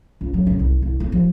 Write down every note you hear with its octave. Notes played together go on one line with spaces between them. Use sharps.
C#2
F#3
C#3
C2
C2
B3
F3